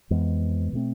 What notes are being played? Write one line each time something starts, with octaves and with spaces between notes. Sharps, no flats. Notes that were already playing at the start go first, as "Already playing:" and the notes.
F2 E3 G#3 B3
B2 A3 C4